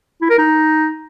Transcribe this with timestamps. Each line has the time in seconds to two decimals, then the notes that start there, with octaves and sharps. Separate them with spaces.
0.22 E4
0.30 A#4
0.38 D#4